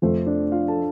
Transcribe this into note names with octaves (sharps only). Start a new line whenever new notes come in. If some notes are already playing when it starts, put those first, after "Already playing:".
F1 F2 F3 A3 C5
D4 D5
F4 F5
A4 A5